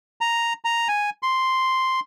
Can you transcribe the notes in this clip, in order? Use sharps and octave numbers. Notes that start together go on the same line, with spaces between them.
A#5
A#5
G#5
C6